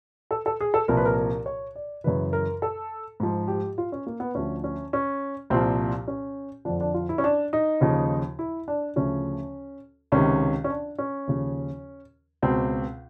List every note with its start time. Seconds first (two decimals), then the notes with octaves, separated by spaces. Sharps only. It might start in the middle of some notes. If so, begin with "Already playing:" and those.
0.31 A4
0.46 A4
0.61 G#4
0.74 A4
0.88 C2 A#2 F3 A#4
0.97 B4
1.05 A#4
1.18 A#4
1.46 C#5
1.76 D5
2.04 F#2 C#3 E3 B4
2.33 A#4
2.62 A4
3.20 G#2 F3
3.48 G4
3.78 F4
3.92 C#4
4.07 A#3
4.20 B3
4.34 D2 D3 F3 C#4
4.64 C#4
4.93 C#4
5.50 C2 A#2 F3 C4
6.08 C#4
6.65 F2 D3 F3 D4
6.81 D4
6.94 F4
7.09 E4
7.18 C#4
7.24 D4
7.53 D#4
7.81 D#2 C#3 F3
8.39 E4
8.68 D4
8.96 D2 C#3 F3 C#4
10.12 C#2 C3 D#3 C#4
10.64 C#4
10.70 D4
10.99 C#4
11.27 D#2 C#3 F3
12.42 C#2 B2 C4